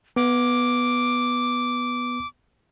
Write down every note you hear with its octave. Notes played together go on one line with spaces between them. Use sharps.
B3 D6